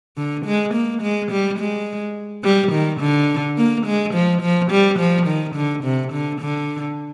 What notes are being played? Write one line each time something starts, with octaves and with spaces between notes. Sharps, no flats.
D3
G#3
A#3
G#3
G3
G#3
G3
D#3
D3
A#3
G#3
F3
F3
G3
F3
D#3
D3
C3
D3
D3